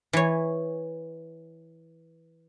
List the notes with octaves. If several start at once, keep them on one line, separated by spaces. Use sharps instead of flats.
E3 C#5